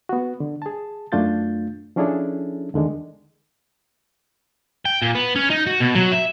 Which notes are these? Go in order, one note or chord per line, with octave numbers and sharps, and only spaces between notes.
B3 F#4
D3
G#4 A5
F#2 A3 D4 F4 G6 A6
F3 C#4 D4 E4 G#4 A4
E2 D3 D#3 G#3
G5
A#2
B3
C#4
D#4
F#4
B2
F#3
E5